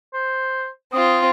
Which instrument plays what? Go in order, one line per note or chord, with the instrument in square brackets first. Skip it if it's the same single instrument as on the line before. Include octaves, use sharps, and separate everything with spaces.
[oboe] C5
[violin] C4 F4 [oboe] D#6